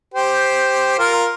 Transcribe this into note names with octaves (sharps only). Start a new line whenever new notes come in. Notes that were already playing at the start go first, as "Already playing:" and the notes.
G4 C5
F4 A#4